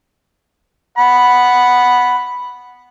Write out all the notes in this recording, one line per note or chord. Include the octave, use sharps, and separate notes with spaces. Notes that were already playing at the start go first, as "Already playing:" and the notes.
F#5 B5